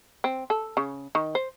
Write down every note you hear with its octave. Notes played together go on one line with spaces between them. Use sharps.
C4
A4
C#3
D#3
C5